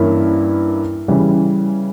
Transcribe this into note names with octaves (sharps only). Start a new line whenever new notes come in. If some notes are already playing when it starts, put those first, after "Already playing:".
Already playing: G2 E3 A#3 C#4 E4
C#3 E3 G3